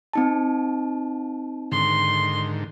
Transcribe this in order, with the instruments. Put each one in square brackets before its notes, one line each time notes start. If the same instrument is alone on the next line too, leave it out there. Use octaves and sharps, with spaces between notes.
[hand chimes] C4 D#4 A5
[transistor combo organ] G#2 D3 D#3 [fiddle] C6